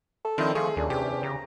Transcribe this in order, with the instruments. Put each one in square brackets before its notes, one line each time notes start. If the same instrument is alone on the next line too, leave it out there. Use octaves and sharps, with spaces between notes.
[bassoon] A4
[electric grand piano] D#3 F3 D#5 [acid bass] C4 [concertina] D4 E4 C5
[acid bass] F3 [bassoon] A3 [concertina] F4 C#6 [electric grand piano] G#4
[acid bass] D#2 [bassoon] A#2 [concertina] C#4 D4
[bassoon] E2 [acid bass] C3 [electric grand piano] G4
[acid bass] C#3 [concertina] A#5